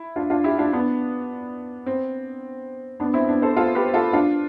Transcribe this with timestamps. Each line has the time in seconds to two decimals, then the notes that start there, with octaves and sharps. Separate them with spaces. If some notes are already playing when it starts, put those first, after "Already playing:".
Already playing: E4
0.16 D4 F4
0.30 D4 F4
0.44 E4 G4
0.58 D4 F4
0.73 B3 D4
1.86 C4
3.00 B3 D4
3.14 C4 E4
3.28 B3 D4
3.42 A4 C5
3.56 F4 A4
3.75 G4 B4
3.94 F4 A4
4.13 D4 F4